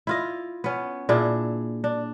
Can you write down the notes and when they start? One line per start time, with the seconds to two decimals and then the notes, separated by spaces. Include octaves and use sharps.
0.07 E4 F4 D#5
0.64 B3 C#4
1.09 A#2 D4 E4 G#4
1.84 D4